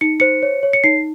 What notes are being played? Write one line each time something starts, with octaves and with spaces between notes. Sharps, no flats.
D#4 C#7
C5 C#7
C#5
C#5
C#7
D#4 C7